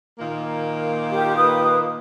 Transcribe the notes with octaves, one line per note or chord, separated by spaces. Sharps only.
A#2 D#3 A#3
G4
B4 D#6